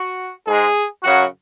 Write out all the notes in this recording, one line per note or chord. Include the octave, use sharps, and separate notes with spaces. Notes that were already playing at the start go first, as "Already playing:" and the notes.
Already playing: F#4
G#2 G#3 G#4
F#2 C#3 F#3 F#4